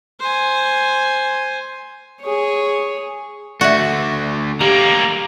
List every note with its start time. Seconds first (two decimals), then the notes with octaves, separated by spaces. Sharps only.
0.20 C5 G#5
2.22 G#4 C#5
3.61 D3 A3 F#4 D5 E5
4.61 G3 A#3 G4 A#5